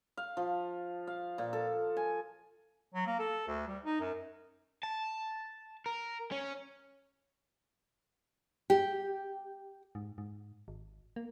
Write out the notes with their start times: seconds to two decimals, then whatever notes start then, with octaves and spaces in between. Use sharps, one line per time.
0.17 F5
0.37 F3
1.07 F5
1.38 A#2
1.53 A4
1.97 G#5
2.94 F#3
3.06 A#3
3.19 A4
3.48 D2
3.67 G3
3.84 D#4
4.00 F#2
4.83 A5
5.86 A#4
6.32 C#4
8.70 G4
9.95 G#2
10.18 G#2
10.68 G#1
11.16 A#3